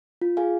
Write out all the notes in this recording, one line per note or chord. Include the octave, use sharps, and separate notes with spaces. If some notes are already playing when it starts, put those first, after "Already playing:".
F4
G#4 F5 G#5